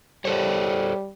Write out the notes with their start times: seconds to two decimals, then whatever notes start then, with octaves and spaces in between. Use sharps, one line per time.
0.25 G3 A4 C5 C#5